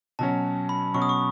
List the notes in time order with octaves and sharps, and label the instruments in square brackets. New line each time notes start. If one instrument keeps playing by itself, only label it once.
[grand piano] B2 F#3 C#4 [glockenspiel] A5
[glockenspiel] B5
[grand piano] B2 F#3 C#4 [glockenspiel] C#6
[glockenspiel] D#6
C#6